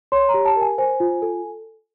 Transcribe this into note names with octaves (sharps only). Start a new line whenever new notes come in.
C#5 C6
A#5
G4
A5
A#4
G#5
C5 G#5
F4
A4